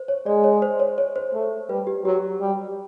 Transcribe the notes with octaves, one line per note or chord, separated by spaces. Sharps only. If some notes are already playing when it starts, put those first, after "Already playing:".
Already playing: C5
C#5
G#3 D5
C#5
C5
C#5
C#5
C5
A3
G3 B4
G4
F#3 G4
G3